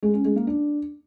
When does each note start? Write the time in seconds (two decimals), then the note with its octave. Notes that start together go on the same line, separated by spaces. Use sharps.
0.03 G#3
0.14 C#4
0.25 G#3
0.36 A#3
0.47 D4